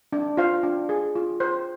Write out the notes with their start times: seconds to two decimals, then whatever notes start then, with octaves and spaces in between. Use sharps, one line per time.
0.12 D4
0.37 F4 C5 F5
0.63 D4
0.89 G#4
1.15 F4
1.40 C5